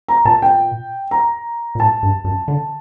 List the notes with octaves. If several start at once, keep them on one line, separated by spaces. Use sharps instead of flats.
A#5
A#2 A5
G5
A#5
A#2
A2 A5
G2
F#2
D3